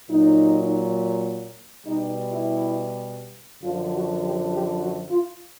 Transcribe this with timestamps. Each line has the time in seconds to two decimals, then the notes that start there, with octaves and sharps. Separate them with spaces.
0.10 A#2 F#3 D#4
1.86 B2 G3 D#4
2.31 E4
3.63 F#2 D3 F3 F4
3.93 F#4
4.22 G4
4.51 G4
4.81 F#4
5.10 F4